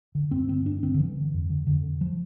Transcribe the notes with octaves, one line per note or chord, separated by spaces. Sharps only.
D3
G2 C4
D3 C4
G2 D4
D3 C4
D3
G2 E3
D3
F2
D3
F2 D3
D3
F3